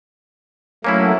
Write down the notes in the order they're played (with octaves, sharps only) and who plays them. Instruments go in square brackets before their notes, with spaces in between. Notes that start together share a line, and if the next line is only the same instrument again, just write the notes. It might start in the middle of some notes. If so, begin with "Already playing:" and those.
[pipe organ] F#3 A3 [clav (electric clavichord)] A#3 C#4 E4